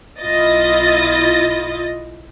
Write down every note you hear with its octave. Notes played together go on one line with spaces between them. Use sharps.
B1 E4 F4 D#5 A6